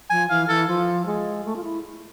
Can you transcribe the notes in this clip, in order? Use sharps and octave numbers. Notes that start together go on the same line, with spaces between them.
F3 G#5
E3 F5
E3 A4
F3
G#3
A3
F4
E4